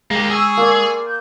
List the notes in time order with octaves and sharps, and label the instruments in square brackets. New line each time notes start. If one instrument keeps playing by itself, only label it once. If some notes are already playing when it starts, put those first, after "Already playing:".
[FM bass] G#3 [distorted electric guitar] A#3 G4
[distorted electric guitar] G#4 [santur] G5 [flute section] C#6 E6
[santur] A#3 C5 D5
[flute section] G6